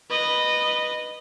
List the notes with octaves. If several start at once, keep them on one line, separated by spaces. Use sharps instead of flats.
B4 D#5